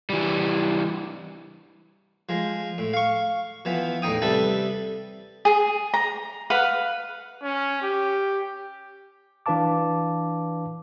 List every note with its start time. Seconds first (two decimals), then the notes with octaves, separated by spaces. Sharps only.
0.10 E3 G3
2.29 F3 G#3
2.78 A2
2.94 F5 C#6
3.65 E3 F3 B3
4.02 E2 A2 D#4 G5 D#6
4.22 C3 G3 A4 B4 E5 A5
5.45 G#4
5.94 A#5
6.50 B4 F5 F#5
7.43 C#4
7.82 G4
9.46 E3 D4 B4 F5 A5 D6